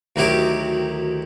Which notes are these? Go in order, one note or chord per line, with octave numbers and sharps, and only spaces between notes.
D2 D#3 F#3 E4 G4 D6